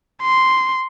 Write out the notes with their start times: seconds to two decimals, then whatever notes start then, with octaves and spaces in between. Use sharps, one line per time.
0.22 C6